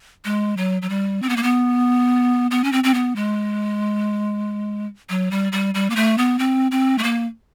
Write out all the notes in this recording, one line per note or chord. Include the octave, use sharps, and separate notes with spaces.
G#3
F#3
F#3
G3
C4
B3
A#3
B3
B3
C#4
C4
C4
B3
G#3
F#3
G3
G3
G3
A#3
A3
B3
C4
C4
A3
A#3